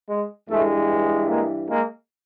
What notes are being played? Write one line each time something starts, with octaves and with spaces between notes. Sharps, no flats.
G#3
G2 E3 G#3 A3
G#3 A#3
G#3 A#3